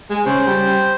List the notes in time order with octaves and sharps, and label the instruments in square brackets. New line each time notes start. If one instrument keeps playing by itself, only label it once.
[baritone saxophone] G#3 [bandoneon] G#4
[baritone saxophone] C#3 [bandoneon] C5
[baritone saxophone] G3